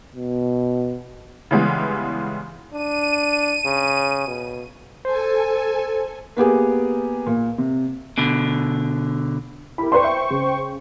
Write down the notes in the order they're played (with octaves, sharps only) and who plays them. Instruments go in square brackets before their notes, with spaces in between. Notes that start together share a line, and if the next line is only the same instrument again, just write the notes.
[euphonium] B2
[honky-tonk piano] C#3 E3 G3 G#3 B3
[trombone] D4 [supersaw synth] D#7
[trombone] C#3
B2
[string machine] A4 G#5 [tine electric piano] C5
[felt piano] A#3 B3 G4 G#4
A#2
C3
[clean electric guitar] B2 D3
[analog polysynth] E4 G4 A#4 [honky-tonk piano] B5
[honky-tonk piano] B4 D5 C6 [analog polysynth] C5 G5 C#6
[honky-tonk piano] E5
C#3